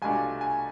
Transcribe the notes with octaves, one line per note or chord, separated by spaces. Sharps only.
C2 B2 A3 D4 F4 G#5
G#5